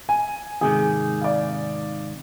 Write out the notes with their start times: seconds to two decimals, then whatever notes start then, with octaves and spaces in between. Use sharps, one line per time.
0.09 G#5
0.61 G#2 C3 D#3 G#4
1.21 D5 F5